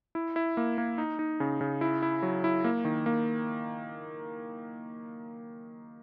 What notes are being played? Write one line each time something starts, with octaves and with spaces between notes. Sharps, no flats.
E4
E4
A#3
A#3
D#4
D#4
C#3
C#3
E4
E4
F#3
E4
A#3
D#3
A#3